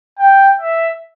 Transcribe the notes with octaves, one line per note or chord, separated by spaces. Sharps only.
G5
E5